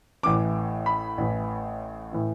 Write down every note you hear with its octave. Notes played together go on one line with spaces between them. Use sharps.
A1 A2 E3 D6
B5
A1 A2 E3
A2 E3